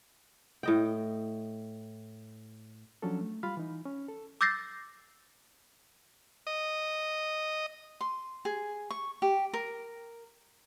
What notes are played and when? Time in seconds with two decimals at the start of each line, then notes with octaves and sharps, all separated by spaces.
0.63 A2 D#5 G5
3.02 F3 F#3 C#4 D4 A4
3.21 A3
3.43 G3 F4 F5 B5 F6
3.57 E3 D#4
3.85 C#4
4.08 A4
4.41 D6 E6 G6 A6 A#6 C7
6.47 D#5
8.01 C6
8.45 G#4
8.91 C#6
9.22 G4
9.54 A#4